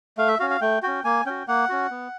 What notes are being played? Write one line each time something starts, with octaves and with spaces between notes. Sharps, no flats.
A3 F5
E5
C#4 F#4 F5
F5
A3 G5
C#4 F#4 G5
A#3 G#5
C#4 F#4 G5
A#3 F#5
C#4 F#4
B3